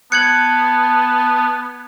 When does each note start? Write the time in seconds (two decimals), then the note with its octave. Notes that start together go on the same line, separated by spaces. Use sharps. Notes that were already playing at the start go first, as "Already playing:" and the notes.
0.12 B3 A5 F#6 G#6 C#7 F#7